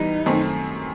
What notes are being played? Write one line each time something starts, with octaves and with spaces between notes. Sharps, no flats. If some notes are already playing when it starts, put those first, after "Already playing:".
Already playing: E3 G3 B3 D#4
F#2 D#3 A3 C4